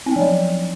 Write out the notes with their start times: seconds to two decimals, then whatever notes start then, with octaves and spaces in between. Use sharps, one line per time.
0.06 C4
0.11 B3
0.16 F3
0.21 F#3